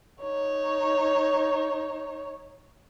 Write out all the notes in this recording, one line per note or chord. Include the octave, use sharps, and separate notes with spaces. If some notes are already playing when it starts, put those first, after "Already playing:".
D#4 C#5